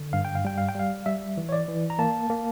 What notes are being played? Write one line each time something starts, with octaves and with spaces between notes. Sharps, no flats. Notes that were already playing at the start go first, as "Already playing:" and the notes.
Already playing: D3
G2 F5
G5
F5
G3 G5
F5
G5
G3 F5
G3 E5
E3
C#5
D5
E3
A#5
A#3 A5
A#3